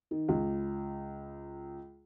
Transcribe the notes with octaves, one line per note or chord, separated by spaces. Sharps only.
D#3
C#2